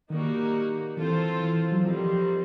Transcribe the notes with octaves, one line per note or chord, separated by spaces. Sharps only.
D#3 G3 A#3 D#4 F#4
E3 C4 F4 A4 C5
E3
F#3
D#3 F3 G3 C4